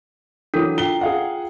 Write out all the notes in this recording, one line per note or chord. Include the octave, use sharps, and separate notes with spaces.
E3 F#3 D4 A4 A#4
F4 G5 G7
G#4 F5 F#5